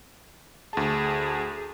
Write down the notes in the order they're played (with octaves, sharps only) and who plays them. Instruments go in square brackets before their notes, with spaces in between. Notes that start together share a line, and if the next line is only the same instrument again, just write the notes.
[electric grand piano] D2 A5 [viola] G#4